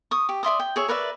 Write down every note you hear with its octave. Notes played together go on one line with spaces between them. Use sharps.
C#6 D#6
G4
D5 E5 C6 D#6
G5
G#4 C#5 E5
A#4 B4 D5 E5